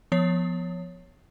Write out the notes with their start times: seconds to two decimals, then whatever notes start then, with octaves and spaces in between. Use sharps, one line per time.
0.12 F3 B3 C#5 C7